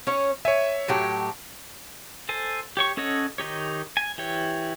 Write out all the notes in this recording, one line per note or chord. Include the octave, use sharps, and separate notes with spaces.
C#4 C#5
C#5 E5 G#5
A2 F#3 G4
A4 C5 G#5
G4 C#5 C#6
C#4 A4 C#5 D#5 F#5
D#3 D#4 G4 C#5
G#5
E3 G4 C#5